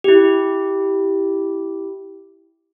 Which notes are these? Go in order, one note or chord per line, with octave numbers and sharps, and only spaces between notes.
E4 G4